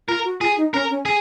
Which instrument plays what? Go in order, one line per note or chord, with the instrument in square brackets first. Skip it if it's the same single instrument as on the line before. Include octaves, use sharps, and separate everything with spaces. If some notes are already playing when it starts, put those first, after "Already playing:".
[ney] F4 [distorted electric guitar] A#4
[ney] F#4
[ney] F4 [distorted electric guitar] G#4
[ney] D#4
[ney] C#4 [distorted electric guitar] A#4
[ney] C#4
[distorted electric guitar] G#4